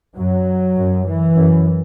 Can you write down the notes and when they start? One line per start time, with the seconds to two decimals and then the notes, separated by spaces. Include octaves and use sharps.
0.17 F#2 F#3
0.76 F#2
1.06 E3
1.36 F#2